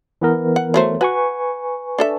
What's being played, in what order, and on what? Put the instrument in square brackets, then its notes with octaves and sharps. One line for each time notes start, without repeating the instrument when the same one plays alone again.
[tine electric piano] E3 B3 A#4
[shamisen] F#5
F#3 A3 C5
[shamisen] F#4 [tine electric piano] B4 G#5 C#6
[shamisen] D4 A4 E5